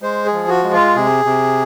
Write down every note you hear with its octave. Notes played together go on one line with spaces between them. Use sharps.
G#3 C5
G#4
F3
F#4
G#3
F4
C3 G#4
C3